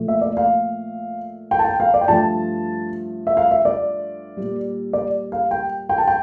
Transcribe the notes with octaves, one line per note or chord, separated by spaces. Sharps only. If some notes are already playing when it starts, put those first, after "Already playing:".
Already playing: A#2 F3 A3
E5
D5
F5
G5
A5
G5
F5
D5
G5
G2 F3 A3 A5
E5
F5
E5
D5
A#2 G3
D5
F5
G5
G5
A5
G5